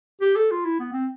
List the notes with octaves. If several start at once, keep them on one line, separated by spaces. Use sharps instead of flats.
G4
A4
F4
E4
B3
C4